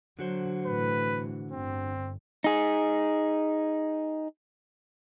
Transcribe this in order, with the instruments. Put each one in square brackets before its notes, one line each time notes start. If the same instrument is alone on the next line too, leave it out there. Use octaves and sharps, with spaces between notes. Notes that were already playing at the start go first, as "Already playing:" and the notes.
[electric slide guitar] D3 F#4 C5 [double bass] F#3
[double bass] A2 E3 [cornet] B4
[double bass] G1 [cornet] C4
[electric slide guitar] D#4 G#4